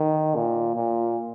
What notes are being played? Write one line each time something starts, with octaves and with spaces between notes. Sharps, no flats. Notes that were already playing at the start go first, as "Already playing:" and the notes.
Already playing: D#3
A#2
A#2